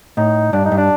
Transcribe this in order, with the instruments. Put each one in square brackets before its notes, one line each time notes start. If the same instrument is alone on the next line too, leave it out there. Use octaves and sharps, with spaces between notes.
[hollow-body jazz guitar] A2 [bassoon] D#4
[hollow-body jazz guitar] G2 [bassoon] D4
[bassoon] D#4
[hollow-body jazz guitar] G2
[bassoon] D4